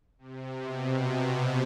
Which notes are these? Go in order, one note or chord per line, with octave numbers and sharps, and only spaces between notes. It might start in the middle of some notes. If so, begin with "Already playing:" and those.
C3
B2
C3